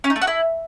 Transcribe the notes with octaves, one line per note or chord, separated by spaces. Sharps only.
C#4
D#4
A3
F#4
E4